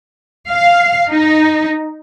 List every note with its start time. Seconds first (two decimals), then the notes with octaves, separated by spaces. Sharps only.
0.50 F5
1.09 D#4